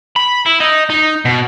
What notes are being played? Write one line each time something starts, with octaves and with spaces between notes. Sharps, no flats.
B5
E4
D#4
D#4
B2